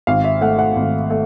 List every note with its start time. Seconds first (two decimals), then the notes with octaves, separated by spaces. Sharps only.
0.07 G#1 F5
0.24 E5
0.41 A3 F#5
0.59 F#5
0.76 G#1
1.10 A3